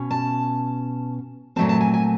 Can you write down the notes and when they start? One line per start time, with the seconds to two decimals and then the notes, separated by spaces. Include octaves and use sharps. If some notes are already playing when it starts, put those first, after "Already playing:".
Already playing: B2 C#4
0.11 A5
1.56 A#2 F#3 A3 C4 A5
1.69 A5
1.81 G#5
1.94 G#5